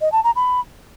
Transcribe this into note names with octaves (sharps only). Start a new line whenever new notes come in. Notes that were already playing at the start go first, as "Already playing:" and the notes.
D#5
A5
A#5
B5